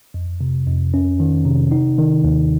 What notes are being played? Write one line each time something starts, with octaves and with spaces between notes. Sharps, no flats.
F2
C3
F2
C#4
D#3
C3
D#4
D#3
D#2